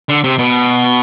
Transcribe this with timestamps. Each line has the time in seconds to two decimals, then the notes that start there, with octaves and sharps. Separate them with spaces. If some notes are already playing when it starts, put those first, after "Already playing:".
0.09 D3
0.24 C3
0.38 B2